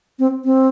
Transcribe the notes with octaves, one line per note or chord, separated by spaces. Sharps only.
C4
C4